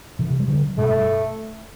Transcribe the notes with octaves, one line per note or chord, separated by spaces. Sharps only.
C3 E3
G3
D3 F#3
G2 B2 A3